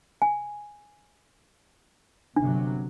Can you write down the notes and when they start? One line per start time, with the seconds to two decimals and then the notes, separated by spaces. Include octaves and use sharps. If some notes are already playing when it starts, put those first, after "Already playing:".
0.22 G#5
2.36 G1 C3 F#3 D4